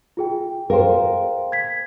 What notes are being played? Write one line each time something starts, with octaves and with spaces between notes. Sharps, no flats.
F4 G#4 G5
G#4 A#4 C5 F5 G5
G#6 B6